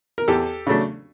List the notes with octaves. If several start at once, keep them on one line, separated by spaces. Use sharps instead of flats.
A#4
E2 G4 A4
C#3 F#3 A3 D4